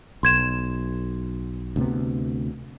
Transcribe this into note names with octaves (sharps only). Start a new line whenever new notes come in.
B1 C6 G#6 E7
D2 C3 B3